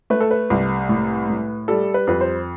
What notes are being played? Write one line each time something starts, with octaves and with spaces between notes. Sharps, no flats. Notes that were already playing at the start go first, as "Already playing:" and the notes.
A3 B4
A4
B4
C2
A2
A2
G3 A4
B4
F2 B4
C5